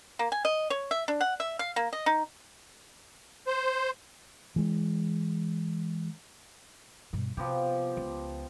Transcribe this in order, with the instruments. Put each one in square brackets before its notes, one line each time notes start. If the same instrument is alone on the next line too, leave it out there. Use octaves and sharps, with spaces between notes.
[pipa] A#3
G#5
D#5
C#5
E5
D4
F#5
E5
F5
A#3
D#5
D#4
[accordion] C5
[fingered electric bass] E3 G#3
[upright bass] G2 B2
[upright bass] C3 [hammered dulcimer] F3 B3 G4
[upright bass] C#2